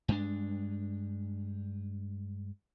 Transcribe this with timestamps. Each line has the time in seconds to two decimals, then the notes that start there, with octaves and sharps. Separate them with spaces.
0.08 G2 G#3 D4